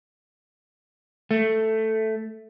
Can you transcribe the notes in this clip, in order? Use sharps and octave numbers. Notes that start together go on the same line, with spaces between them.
A3